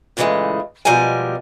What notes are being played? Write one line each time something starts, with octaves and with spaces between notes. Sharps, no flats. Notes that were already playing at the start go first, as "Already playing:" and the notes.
A#2 C#3 E3 F#3 G#3 A3
B2 F3 G3 G#3 A#4 G#5